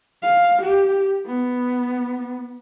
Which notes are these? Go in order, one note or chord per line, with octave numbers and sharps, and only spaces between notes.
F5
G4
B3